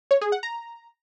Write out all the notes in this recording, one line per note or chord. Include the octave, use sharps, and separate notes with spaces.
C#5
G#4
F#5
A#5